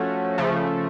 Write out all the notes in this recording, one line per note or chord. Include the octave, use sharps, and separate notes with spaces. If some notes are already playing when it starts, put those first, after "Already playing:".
Already playing: F3 A3 C#4 F#4
C#3 F3 A3